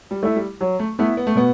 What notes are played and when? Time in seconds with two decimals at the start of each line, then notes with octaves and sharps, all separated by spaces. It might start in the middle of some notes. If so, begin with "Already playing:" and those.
0.11 G3
0.23 A3 E4
0.36 G3
0.61 F#3
0.79 A3
0.99 A3 B3 E4
1.17 B3
1.27 A3
1.35 B2 B3